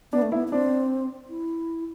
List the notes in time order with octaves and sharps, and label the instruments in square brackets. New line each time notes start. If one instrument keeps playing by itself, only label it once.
[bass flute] B3 [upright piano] D4
[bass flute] A3
[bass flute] B3 [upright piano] E4
[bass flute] B3
[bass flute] C4 [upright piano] D4
[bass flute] E4